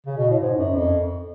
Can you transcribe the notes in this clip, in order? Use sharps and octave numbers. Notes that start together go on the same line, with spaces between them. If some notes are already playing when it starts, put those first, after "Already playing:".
C#3
B2
A2
G#2
F#2
F2